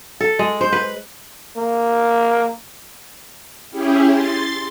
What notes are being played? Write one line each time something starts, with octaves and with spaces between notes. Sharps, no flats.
A4
G#3
C5
B4
A#3
C#4 E4 G4 G#4
C6 A6